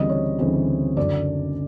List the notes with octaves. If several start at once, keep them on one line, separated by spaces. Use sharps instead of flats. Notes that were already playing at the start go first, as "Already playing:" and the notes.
Already playing: D2 C#3 E3 G3 C4 D#5
C#5
D2 C#3 E3 G3 C4
F#1 F#2 D3 F#3 D5